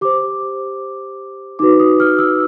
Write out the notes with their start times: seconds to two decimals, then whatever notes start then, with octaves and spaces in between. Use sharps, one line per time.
0.01 G4 C5 D6
1.59 D#4 F#4 B4 D6
1.80 D#6
2.00 F6
2.19 E6